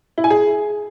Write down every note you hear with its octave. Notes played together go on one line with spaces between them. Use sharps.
E4
G#5
G#4